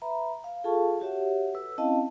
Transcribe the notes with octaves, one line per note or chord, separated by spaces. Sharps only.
B4 E5 A#5 B5
F5
F4 G#4 A4 F5 A5 C#6
F#4 G4 C#5 E5 F#5
A4 B4 E6
C4 C#4 E4 D#5 F5 A5